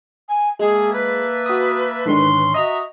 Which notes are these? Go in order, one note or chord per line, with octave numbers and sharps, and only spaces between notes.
G#5
G#3 A#3 G#4 E5 A5
B4
F#4 D#6
G#2 D3 D#3 C#4 C6
F#4 D#5 E5 A#5